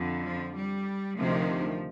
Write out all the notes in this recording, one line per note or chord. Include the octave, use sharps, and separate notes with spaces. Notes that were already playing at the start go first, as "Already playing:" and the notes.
Already playing: F2 D3
F3
G3
D2 C3 D#3 F3